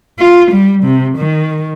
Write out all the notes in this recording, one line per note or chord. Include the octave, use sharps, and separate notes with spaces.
F4
G3
C3
D#3